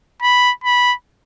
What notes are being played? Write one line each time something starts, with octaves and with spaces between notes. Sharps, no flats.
B5
B5